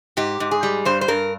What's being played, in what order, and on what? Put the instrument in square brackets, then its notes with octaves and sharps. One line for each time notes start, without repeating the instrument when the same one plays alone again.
[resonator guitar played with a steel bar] G#2 G4
G#2
G#4
G3
G2 C5
C5
G2 A#4